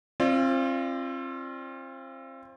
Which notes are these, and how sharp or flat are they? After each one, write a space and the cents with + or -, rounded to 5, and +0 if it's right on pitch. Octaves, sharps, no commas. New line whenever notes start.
C4 +30 F4 -25 D5 +30